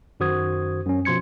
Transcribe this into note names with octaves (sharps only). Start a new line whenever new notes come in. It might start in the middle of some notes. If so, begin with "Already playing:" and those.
F#2 D#3 F#4 C5 D#6 G#6
F#2 C#4
B2 F3 C6 G#6 C#7